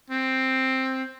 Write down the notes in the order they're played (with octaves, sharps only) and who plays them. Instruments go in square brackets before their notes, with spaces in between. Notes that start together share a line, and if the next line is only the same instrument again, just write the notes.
[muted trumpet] C4